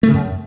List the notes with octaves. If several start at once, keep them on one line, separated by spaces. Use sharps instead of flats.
A3
C#3
F#2